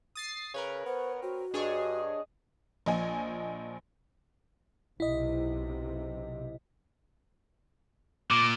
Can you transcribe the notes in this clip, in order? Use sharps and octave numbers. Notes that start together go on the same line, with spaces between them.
D#6 A6 C7
C#3 A#4 B4 C#5
B3 C5
C4 F#4
G2 D4 G#4 C#5 D#5
A#1 F3 D#5 G#5
B1 C3 E4 D#5
A#2 D6